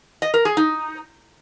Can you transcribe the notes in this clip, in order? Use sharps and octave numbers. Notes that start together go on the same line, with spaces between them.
D#5
A#4
G#4
D#4